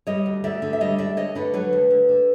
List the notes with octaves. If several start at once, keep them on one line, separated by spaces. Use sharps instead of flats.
G3 C#5 D#5
D2
D2 D5 E5
D3
E5
G3 C#5 D#5
D2 D5 E5
D2 C#5 D#5
D3 B4 C#5
F#3 B4 C#5
D2
D2
D3